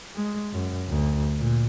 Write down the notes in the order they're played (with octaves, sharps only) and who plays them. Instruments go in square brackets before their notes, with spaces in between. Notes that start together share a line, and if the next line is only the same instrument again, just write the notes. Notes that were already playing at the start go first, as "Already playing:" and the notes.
[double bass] G#3
F#2
D2
A#2